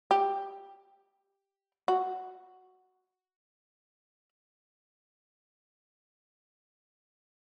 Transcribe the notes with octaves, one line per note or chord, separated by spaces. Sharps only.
G4
F#4